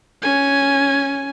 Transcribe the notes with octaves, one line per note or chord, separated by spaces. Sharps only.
C#4 G#5